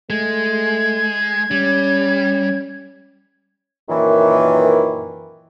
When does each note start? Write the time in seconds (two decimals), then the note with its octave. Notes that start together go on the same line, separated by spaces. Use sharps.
0.10 G#3 A3 G#6
1.51 G3 C#4
3.89 F#2 A#2 D#3 E3